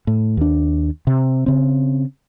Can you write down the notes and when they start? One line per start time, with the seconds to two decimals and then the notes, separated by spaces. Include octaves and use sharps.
0.07 A2
0.37 D#2 D4
1.07 C3
1.46 C#3 C4